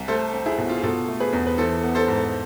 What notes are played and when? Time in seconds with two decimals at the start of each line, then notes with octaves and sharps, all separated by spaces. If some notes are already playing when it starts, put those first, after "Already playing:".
Already playing: C2
0.08 A3 A4 C5
0.33 C4
0.46 E4 G#4
0.58 B2
0.69 F4
0.76 G#4
0.83 B2 F4 A4
1.08 A3
1.20 G#4 B4
1.33 E2
1.47 B4
1.58 E3 A4 C5
1.83 B3
1.95 A4 C5
2.08 G#2